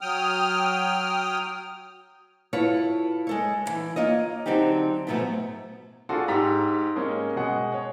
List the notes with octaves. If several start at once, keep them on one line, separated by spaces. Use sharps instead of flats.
F#3 G5 D#6 F6
E4 F4 A4 B4 C#5
G#3 A4 C#5
D#2 E3
A#3 F4 C#5 D#5
D3 F#3 C4 D#4 F#4 G4
G#2 B2 F3 F#3 A3 B3
D4 F4 F#4 G#4 A4 C6
G#2 G4 A#5 E6 B6
G#3 A#3 C#4
B2 G#3 F#5
C#5